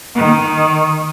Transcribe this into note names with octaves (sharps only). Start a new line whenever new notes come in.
D#3